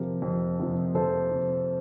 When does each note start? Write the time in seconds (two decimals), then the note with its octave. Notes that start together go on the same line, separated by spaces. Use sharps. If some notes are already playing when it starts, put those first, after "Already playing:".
Already playing: F2 C3 F3 G4 A#4
0.22 F2
0.59 C3 F3
0.94 F2 A4 C5
1.31 C3 F3